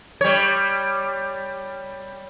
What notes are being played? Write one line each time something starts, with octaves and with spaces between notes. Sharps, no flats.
G3 C#5